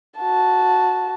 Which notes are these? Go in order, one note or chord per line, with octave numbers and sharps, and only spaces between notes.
F#4 A5